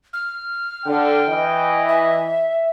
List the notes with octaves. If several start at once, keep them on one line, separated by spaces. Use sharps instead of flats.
F6
D3 G5
E3 D#5
E5